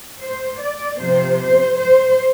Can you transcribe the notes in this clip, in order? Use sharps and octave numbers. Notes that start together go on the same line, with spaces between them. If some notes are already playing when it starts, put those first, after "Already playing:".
C5
D5
C3 F3 C5
C5
C5